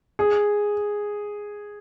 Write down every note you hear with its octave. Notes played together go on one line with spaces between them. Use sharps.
G#4